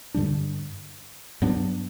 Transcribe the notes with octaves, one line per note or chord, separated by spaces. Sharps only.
G2 D3 G3 D4
G2 F#3 B3 D4